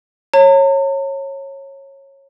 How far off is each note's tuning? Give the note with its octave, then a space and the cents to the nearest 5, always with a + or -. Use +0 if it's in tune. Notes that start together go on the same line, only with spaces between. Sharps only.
C#5 -20 A#5 -45